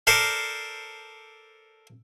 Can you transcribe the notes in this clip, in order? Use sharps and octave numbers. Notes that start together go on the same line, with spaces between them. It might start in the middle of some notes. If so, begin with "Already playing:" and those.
A4 A#4 C5 D5